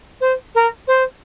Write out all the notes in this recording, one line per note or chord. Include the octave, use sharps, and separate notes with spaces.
C5
A#4
C5